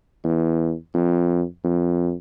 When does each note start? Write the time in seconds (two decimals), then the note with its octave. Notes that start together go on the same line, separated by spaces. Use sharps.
0.24 E2
0.94 F2
1.64 F2